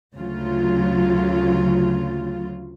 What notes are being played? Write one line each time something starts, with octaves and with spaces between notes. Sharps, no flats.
D2 C#3 F#3 F4